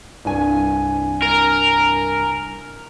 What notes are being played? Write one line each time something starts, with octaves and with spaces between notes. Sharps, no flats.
C2 G2 G#5
A#4